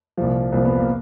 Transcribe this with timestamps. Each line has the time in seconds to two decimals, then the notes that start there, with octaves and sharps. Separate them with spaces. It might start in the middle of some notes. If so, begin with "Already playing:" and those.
0.18 C2 A#2 F3
0.52 C2 A#2 F3 C4
0.65 B3
0.79 A#3